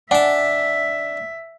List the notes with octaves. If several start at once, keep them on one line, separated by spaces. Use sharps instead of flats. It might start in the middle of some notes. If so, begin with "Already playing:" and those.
D4 E5 F#5 G#5 A5